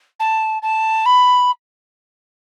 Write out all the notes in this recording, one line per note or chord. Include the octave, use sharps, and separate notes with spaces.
A5
A5
B5